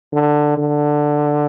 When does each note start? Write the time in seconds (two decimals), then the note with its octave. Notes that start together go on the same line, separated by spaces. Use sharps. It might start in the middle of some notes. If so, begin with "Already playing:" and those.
0.12 D3
0.57 D3